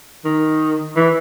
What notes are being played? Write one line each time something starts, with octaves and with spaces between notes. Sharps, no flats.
D#3
E3